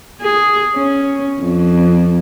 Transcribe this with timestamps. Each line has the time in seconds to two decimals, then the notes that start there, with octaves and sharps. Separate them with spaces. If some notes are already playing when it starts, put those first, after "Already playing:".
0.21 G#4
0.76 C#4
1.41 F2